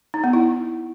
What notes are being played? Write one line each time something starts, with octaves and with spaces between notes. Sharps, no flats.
D#4
B3
E4